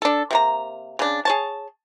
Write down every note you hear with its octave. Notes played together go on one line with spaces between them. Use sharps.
D4 A4
C3 A#3 A#5
C#3 D4
G#4 C#5 A5